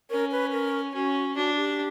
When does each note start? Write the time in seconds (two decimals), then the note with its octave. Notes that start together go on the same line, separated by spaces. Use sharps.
0.10 C#4 A#4
0.31 B4
0.52 A#4
0.94 C#4 F#4
1.36 D4 F#4
1.56 G4